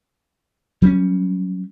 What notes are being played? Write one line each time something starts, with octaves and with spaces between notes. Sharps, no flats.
F#3 G3 C4 C#4